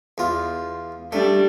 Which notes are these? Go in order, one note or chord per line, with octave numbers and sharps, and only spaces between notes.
E2 F4
G3 A3 D4